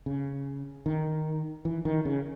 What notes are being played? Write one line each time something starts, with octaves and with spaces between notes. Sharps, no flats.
C#3
D#3
E3
D#3
C#3